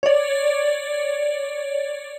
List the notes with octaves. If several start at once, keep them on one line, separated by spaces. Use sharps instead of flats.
C#5 D5